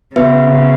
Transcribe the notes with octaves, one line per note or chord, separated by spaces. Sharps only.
C#3 B3 F#4 B4 E5